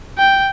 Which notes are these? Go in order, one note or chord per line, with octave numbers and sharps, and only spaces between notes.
G5